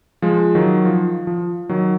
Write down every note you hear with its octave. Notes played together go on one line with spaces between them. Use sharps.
F3 G#3
D#3 F#3
F3
F3
D#3 F#3